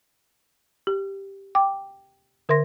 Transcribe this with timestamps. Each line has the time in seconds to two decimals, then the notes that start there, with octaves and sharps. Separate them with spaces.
0.87 G4
1.55 G5 D6
2.49 D3 A#4 E5 C6 A#6